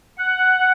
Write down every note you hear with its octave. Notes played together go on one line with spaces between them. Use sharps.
F#5